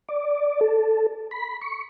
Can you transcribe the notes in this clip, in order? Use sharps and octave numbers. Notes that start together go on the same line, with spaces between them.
D5
A4
B5
C#6